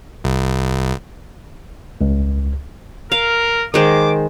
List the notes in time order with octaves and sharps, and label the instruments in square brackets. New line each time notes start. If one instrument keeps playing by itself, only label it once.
[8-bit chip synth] C2
[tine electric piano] C#2
[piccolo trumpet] A#4 [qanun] F5
[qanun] D#3 G#3 C5 [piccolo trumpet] D6